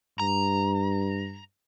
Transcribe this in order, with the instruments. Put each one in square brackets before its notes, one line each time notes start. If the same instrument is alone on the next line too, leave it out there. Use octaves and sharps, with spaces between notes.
[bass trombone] G2 [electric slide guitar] A#5